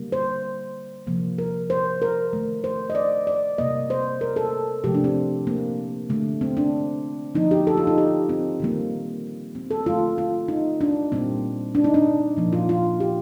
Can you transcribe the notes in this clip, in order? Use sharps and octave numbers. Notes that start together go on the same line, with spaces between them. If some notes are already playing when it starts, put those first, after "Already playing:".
Already playing: D3 G3 A#3
C5
C3 F3 A#3
A#4
C5
A#4
D#3 A3
C5
D#5
D5
D5
C3 G3 A#3 D#5
C5
A#4
A4
C3 F3 A3 G4
D4
C4
A#3
D3 A3
C4
D4
D3 F3 A#3 D#4
G4
A4
F4
D#4
G4
C4
D#3 G3 A#3
C4
A4
D3 A3 F4
F4
D#4
D4
A#2 G3 A#3 C4
D4
D#4
D4
A#2 F3 A#3
F4
F4
G4